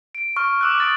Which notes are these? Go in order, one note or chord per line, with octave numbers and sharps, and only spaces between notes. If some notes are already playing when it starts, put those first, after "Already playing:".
D7
C#6 F6
D6 E6 F#6
D#6 A6 D7